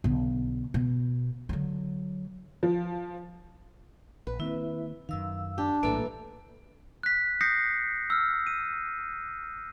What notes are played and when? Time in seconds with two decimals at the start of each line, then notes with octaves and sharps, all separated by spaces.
0.04 B1 D3
0.74 B2
1.49 D3 F#3
2.63 F3
4.27 A#1 B4
4.39 D#3 A#3 C4 E4 E5
5.09 F#2 D#3 F5 E6
5.58 D4 G4
5.83 A#1 A2 E3 G3 A#3 A4
7.03 F#6 B6
7.41 D#6 G6 A#6 C7 C#7
8.10 E6 F6
8.47 D#7